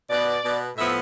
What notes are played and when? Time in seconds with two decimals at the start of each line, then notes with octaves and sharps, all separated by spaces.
0.09 B2 B3 D5
0.44 B2 B3
0.77 A2 F3 B3 E5